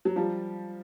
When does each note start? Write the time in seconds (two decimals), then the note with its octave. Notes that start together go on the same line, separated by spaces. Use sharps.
0.05 F#3
0.16 F3 G3